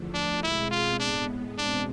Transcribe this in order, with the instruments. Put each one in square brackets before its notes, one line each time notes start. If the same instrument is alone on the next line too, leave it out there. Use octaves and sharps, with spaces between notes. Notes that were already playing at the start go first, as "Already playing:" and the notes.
Already playing: [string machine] E2 D3 F3 A3
[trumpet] D4
[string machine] B2 G#3 C4 G#4 [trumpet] E4
[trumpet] F4
[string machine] A2 G#3 B3 [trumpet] D4
[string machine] E2 B2 G#3 C4 [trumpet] D4